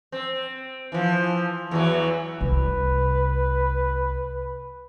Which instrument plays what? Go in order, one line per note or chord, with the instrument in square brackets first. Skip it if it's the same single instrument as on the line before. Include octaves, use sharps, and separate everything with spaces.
[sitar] C4
E3 F3
E2 E3 F#3
[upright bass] C2 [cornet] B4